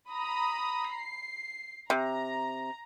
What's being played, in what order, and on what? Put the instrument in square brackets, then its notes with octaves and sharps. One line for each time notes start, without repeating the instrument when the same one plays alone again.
[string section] A#5 B5 D#6
C7
[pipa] C3 [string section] A#5